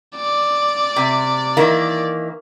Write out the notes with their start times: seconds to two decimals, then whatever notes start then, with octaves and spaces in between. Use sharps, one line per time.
0.16 D5
0.96 C3
1.57 D#3 E3 A#3